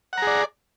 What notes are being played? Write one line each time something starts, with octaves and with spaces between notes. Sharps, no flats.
G#4 D5 F#5 A#5